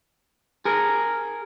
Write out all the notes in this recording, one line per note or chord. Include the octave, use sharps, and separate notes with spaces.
G#4 A#4